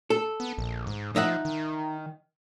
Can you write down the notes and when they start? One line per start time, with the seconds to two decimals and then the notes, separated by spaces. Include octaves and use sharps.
0.10 A4
0.40 B3
0.58 A#1
0.87 G#2
1.16 F3 D#4 E5 F#5
1.45 D#3